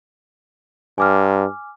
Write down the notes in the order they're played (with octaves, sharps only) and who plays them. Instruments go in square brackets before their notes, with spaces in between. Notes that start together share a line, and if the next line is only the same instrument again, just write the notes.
[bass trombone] G2 [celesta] G#5 D6 F6